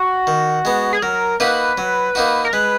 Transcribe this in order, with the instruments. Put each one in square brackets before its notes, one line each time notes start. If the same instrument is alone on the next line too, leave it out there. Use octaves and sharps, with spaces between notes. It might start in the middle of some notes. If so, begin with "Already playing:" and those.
Already playing: [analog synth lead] F#4
[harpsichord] D#3
G#3 B3
[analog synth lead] G#4
[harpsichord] F#3 [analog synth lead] A#4
[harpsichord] A#3 D#4 F#4 [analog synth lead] B4
[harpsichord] F#3
A#3 D#4 F#4
[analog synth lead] A#4
[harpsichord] G#3 [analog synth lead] B4